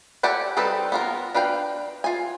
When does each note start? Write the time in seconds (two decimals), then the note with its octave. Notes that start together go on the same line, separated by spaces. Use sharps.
0.23 G4 A4 D5 F#5 G#5
0.57 G3 C4 D#4 A4 B4
0.92 B3 F4 A#4
1.34 D4 B4 F5 G5
2.04 F4 G#5